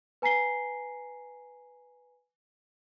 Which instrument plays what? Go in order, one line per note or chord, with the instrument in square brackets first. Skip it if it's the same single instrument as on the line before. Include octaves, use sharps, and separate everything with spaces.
[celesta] B4 G#5 A#5 B6 C7 G7